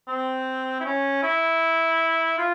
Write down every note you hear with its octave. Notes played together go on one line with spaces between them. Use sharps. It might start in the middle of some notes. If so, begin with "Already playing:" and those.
C4
E4
C#4
E4
F4